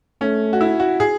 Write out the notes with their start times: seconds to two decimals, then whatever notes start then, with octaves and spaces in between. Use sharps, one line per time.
0.21 A3 C#4
0.53 F#4
0.61 E4
0.80 F#4
1.00 G#4